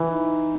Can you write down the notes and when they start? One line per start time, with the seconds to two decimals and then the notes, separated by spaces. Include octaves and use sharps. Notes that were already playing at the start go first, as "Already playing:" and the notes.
Already playing: E3
0.08 D#4